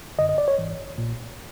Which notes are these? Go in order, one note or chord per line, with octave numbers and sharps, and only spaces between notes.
G#1 F#2 D3 D#5
D#5
D5
C#5
G#1 G#2 E3
A#1 A#2